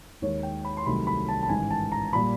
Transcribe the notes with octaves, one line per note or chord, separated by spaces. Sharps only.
D#2 D#3 G#3 C#5
G5
B5
C6
C2 C3 D#3 F#3 A3 B5
B5
A5
A5
A1 G#2 D#3 G#5
A5
A#5
A#2 G3 B5